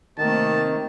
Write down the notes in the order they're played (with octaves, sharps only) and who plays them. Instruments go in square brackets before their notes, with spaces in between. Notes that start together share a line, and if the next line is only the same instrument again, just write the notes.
[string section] C3 A3 A#3 [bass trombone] D#3 [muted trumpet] A5